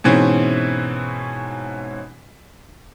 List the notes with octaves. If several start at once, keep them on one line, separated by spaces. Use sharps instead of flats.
G#2 B2 E3 C4 C#4